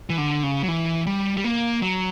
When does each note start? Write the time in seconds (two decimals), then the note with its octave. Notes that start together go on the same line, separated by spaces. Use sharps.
0.10 E3
0.18 D3
0.43 C#3
0.64 F#3
0.68 E3
1.07 G3
1.37 G3
1.44 A#3
1.82 F#3